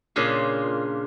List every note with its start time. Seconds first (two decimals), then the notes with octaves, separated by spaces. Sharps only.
0.16 A#2 C#3 D4 F4 G#4